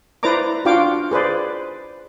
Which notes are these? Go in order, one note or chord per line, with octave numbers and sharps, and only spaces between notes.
E4 B4 C5 D5 A#5 D6
D4 F4 F#4 F5 G5 D6
G#4 B4 C5 D5